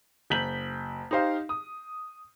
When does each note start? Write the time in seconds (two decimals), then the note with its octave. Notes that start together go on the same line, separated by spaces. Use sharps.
0.30 F#1 G6 B6 F#7
1.11 D#4 G4 C5 F5
1.49 D#6